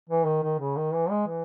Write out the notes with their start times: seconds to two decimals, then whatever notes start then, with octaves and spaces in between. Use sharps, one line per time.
0.09 E3
0.26 D#3
0.43 D#3
0.59 C#3
0.77 D#3
0.94 E3
1.10 G#3
1.27 E3